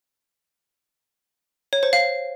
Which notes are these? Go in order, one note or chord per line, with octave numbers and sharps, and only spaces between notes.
C#5
C5
F5